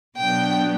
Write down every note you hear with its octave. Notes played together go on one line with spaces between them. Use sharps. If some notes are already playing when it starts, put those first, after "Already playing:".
B2 F#3 B3 D4 G5